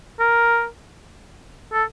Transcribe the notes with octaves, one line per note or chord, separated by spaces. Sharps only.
A#4
A4